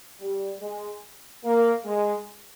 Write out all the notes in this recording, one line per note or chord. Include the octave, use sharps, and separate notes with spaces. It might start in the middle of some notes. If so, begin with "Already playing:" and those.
G3
G#3
A#3
G#3